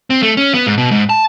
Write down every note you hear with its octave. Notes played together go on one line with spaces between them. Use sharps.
C4
A3
C#4
B3
G#2
B2
G#2
A5